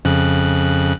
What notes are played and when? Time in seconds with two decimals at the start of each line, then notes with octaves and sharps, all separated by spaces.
0.05 F2 C#3 F#6